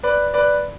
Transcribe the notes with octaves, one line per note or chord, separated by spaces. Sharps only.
B4 D5
B4 D5